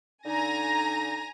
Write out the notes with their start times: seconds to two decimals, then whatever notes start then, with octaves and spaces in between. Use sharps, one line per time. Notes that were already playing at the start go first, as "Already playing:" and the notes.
0.26 D3 D#4 G#5 A#5 A#6